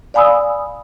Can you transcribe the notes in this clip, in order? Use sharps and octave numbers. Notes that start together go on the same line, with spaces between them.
D5 F5 G#5 B5 D#6 E6